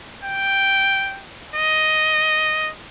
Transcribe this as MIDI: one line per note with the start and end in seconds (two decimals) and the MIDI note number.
0.24 1.21 79
1.56 2.70 75